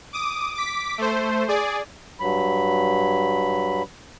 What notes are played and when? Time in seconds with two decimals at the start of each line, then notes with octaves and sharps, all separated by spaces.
0.13 D6 D#6
0.55 D6 B6
0.98 A3 C5
1.48 G#4 D5
2.20 G2 F#3 B5